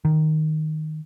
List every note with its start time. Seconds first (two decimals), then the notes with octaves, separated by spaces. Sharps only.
0.05 D#3